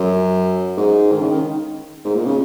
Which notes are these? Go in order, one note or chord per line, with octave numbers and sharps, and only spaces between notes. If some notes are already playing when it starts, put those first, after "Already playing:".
Already playing: F#2
G#2
D#3
C#3
D#3
G#2
A#2
C#3